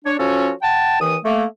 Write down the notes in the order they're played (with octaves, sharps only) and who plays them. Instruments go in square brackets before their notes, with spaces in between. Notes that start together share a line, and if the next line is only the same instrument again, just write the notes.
[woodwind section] D4 C#5
F3 C#4 F#4 A4 C#5
F#5 G5 A5
D#2 E3 D#6
A3 A#3